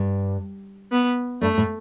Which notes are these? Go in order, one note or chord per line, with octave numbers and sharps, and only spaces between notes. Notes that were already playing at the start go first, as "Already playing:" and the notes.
Already playing: G2
B3
G2 A3
A2